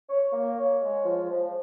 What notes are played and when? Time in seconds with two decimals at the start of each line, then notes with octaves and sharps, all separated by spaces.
0.09 C#5
0.32 A#3
0.57 C#5
0.81 G#3
1.05 F3
1.29 F3